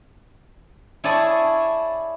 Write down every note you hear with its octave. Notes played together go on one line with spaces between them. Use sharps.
E4 G#4 C#5 D5 G#5 A5